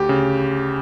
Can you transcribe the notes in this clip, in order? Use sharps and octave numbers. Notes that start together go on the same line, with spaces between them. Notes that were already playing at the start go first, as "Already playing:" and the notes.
Already playing: D2 G4
C#3